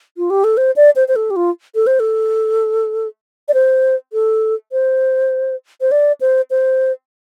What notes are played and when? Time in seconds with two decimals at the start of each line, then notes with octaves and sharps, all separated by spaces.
0.17 F4
0.30 G4
0.44 A4
0.57 C5
0.76 D5
0.96 C5
1.08 C5
1.16 A4
1.30 G4
1.36 F4
1.75 A4
1.87 C5
2.00 A4
3.48 D5
3.54 C5
4.13 A4
4.72 C5
5.81 C5
5.91 D5
6.21 C5
6.50 C5